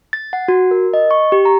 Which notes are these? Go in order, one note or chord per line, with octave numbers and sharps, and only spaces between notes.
A6
F#5
F#4
A#4
D#5
C#6
G4
A#5